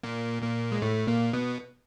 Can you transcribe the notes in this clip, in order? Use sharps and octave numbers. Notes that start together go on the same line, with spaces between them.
A#2 A#3
A#2 A#3
G#3
A2 A3
A#2 A#3
B2 B3